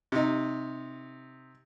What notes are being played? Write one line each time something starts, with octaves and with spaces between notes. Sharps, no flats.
C3 D#4